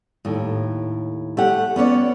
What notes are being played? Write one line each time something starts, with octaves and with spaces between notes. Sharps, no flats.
D#2 A2
A3 G4 F#5
B3 C#4 C#5 D5